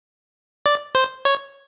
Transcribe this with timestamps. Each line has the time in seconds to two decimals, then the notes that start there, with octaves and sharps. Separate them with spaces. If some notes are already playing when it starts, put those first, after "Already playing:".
0.66 D5
0.95 C5
1.25 C#5